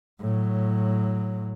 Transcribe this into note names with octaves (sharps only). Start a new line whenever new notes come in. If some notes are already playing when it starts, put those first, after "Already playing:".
A2 F#3